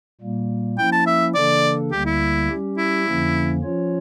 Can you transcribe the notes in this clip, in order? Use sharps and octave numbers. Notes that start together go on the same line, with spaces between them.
A#2 G3 A#3
F3 A#3 C#4 E4 G5
A5
E5
C#3 E3 A#3 D4 A4 D5
D2 D3 G3 A#3 G4
E4
G3 C#4 G4
E4
F2 D3 F3 A#3 C#4
F3 C#4 F4 C#5